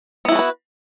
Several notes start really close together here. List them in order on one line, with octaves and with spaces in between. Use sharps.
B3 E4 F#4 A4 B4